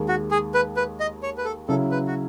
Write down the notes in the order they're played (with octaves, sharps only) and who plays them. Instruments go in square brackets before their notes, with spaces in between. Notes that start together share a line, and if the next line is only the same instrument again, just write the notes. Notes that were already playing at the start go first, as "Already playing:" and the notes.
Already playing: [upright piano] D#2 D#3 G#3
[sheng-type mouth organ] F#4
G#4
B4
B4
D#5
C#5
B4
A4
[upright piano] C#3 F#3 C#4 E4 [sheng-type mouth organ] A4
[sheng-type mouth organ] B4
F#4